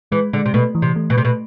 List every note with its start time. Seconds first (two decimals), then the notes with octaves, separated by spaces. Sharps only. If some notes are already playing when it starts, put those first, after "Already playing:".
0.12 E3 G#3
0.33 D3 G#3
0.46 C3
0.54 B2 A3
0.75 E3
0.82 C3
0.96 A3
1.10 B2
1.17 C3 A3
1.25 B2